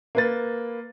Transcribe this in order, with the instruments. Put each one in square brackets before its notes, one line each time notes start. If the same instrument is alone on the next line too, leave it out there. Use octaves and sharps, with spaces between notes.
[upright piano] A#3 B4 A6